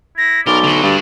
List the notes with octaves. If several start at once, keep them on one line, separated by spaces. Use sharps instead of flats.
E4 A#6
B1 A#4 D5 G7
D3 F#4
G2 D5